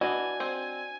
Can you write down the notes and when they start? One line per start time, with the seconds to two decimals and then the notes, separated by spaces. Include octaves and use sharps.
0.01 E3 D4 F#4 D#5 G#5
0.40 C4